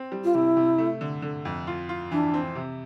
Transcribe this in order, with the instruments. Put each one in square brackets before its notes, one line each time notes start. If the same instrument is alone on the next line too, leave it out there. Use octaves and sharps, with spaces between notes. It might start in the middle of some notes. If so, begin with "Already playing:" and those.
Already playing: [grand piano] C4
G3
[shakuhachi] F4
[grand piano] C3 [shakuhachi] E4
[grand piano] C3
A3
D3
D3
F2
F4
F4
[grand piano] E3 [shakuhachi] D4
[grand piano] C4
C3